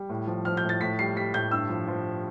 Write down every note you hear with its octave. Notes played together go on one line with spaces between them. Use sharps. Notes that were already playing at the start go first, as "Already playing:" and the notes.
Already playing: G3
A2
F3
F3 F6
G6
A2
A6
A2 B6
G3 C7
G3 B6
A2 G6
G2 E6
F3
F3